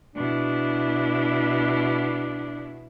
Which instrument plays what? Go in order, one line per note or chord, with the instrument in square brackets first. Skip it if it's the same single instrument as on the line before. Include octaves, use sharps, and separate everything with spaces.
[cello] B2 E4 [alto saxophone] D4